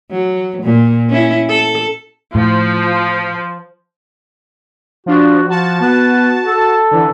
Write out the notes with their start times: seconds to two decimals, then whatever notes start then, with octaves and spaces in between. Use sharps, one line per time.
0.11 F#3
0.63 A#2
1.09 C#4 E4
1.49 A4
2.35 A2 F3
5.06 F3 D4 F#4
5.48 F3 F#4 A5
5.80 B3
6.44 A4
6.91 D3 E3